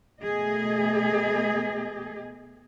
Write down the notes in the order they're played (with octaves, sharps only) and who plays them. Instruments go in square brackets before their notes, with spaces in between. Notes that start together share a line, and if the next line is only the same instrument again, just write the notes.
[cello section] B2 A3 G#4 D#5